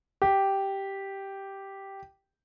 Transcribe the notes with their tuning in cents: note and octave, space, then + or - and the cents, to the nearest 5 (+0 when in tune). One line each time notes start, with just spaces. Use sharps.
G4 -5